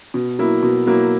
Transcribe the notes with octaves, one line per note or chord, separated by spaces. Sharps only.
B2
F#3 A#3 E4
B2
F#3 A#3 E4